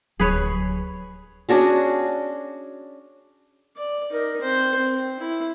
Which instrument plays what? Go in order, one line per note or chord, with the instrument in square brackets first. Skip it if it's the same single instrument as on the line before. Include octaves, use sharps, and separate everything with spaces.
[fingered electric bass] D1 F#3 [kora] G#4 B4 C#5
[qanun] C#4 D4 F#4 G#4
[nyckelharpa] D5
D#4 A#4
C4 C5
C4
E4